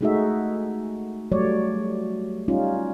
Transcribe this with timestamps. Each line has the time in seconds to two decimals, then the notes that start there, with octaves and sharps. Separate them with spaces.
0.01 G#3 A3 D#4 F#4 G#4 E5
1.32 F#3 G3 A3 C#5 D5
2.48 G3 C#4 D#4 F4